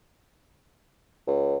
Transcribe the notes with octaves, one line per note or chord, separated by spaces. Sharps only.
C#2